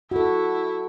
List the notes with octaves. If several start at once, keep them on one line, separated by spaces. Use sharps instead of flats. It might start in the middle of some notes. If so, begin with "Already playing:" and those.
E4 F#4 A4